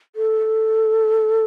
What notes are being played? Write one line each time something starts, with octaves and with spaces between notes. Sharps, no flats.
A4